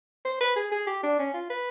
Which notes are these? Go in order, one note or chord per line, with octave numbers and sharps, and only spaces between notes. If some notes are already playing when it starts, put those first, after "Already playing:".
C5
B4
G#4
G#4
G4
D4
C#4
F4
B4